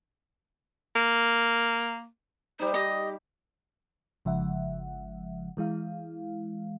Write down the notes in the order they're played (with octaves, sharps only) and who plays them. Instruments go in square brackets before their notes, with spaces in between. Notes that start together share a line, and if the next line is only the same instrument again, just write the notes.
[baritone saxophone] A#3
[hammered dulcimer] G3 D#4 [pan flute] C5
[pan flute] G4 [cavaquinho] D#5
[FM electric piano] G1 C#3 F3 G#3 E5 F#5
E3 G#3 E4 F5